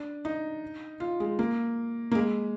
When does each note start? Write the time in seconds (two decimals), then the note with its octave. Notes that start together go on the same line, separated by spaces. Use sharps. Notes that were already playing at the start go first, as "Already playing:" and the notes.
Already playing: D4
0.25 D#4
1.00 F4
1.20 G#3
1.39 A#3
2.11 A#3
2.15 G#3